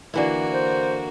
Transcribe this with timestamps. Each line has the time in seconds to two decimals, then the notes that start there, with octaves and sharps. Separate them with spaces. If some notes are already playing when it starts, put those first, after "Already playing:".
0.14 D3 E3 A#3 E4 F#4
0.52 C5